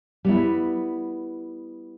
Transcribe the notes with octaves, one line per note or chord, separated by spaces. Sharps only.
G3 B3 E4